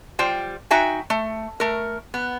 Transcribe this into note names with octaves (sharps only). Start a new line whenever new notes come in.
G3 F4 C5 G5
D#4 F#4 E5 G5 G#5
A3
A3 A#4
B3